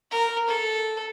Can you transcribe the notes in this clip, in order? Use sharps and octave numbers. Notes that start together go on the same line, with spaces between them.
A#4
A4